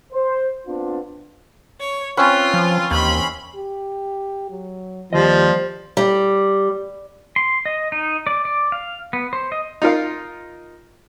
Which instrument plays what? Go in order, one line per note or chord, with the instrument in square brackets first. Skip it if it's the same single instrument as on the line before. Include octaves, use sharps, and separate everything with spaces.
[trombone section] C5
B3 C4 D4 F4
[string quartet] C#5
[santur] C4 C#4 B4 [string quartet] F4
[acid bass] F3
[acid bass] D#2 [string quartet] E3 B5 C6
[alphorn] G4
F#3
[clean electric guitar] D#2 D#5 [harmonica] F3 G3 [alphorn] C5
[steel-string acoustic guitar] G3
[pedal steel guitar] C6
D#5
D#4
D5
D5
F5
B3
C5
D#5
[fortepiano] D#4 F4 A#4 F5